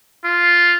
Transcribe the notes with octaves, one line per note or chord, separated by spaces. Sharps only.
F4